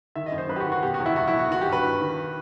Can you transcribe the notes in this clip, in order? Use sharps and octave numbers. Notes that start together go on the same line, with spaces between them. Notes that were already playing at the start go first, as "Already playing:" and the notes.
D#3 E5
D#5
F#2
C5
F#2 B4
G4
F#4
D#3
F#4
B2 G4
F#4
E2
E4
E2 F#4
E4
B2
F#4
D#3 F#4
G4
G2
B4
G2
D#3